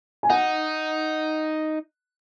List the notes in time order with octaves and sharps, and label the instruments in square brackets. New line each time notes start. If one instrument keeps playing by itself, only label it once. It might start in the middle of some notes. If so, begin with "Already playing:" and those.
[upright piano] G#5
[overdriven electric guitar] D#4 [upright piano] F#5